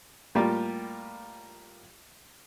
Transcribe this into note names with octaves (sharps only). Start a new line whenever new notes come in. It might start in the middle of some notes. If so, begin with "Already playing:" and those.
A2 G3 A#3 F4 G4